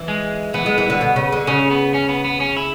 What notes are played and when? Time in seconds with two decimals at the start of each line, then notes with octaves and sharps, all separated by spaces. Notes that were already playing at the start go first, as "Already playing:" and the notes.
Already playing: E3
0.08 G#3
0.54 E3 B3
0.66 G#3
0.78 E3
0.90 D3
1.01 B2
1.16 C#3
1.32 D3
1.47 C#3 C#4
1.70 B3
1.94 C#4
2.09 B3
2.25 B3
2.40 C#4
2.57 E4